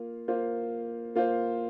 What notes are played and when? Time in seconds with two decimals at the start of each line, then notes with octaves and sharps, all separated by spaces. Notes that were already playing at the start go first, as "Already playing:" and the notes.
Already playing: A#3 F4
0.28 A#3 F4 C5
1.16 A#3 F4 C5